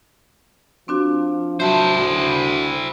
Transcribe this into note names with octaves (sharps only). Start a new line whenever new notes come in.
F3 C4 D4 F#4
F#3 E4 C5 E5 A5
D2